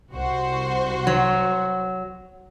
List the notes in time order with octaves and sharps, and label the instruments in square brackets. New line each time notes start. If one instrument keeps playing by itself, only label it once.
[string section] C2 F#4 C5
[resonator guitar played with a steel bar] F#3